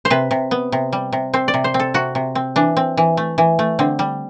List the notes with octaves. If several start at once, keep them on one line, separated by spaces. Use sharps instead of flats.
C5
C3 B4
C3
B3
C3
G3
C3
C4 C5
D5
C3
C5
C4
A4
C3 F#4
C3
C4
E3 D4
C4
E3
A3
E3
A3
D3 C4
G3